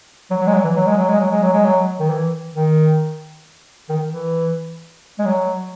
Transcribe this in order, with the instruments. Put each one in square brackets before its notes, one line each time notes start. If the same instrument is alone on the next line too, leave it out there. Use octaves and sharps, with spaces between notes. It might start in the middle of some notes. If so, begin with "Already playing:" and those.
[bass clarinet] F#3
F#3
G#3
F#3
E3
F#3
G#3
F#3
G#3
F#3
G#3
F#3
G#3
F#3
D#3
E3
D#3
D#3
E3
G#3
F#3